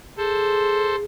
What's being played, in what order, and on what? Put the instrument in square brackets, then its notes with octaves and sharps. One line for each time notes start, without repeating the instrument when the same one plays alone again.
[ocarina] G#4 [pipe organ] A4 C5